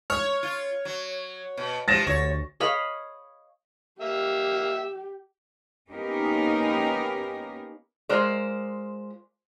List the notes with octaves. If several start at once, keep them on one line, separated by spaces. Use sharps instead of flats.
C#5 F6
F4
F#3
B2
C3 F3 G3 A6 A#6 E7
D2 C#5
C#5 D#5 F5 B5
A#3 G4 E5
A#3 B3 C#4 D#4 G4 A#4
G#3 F4 A#4 C5 D5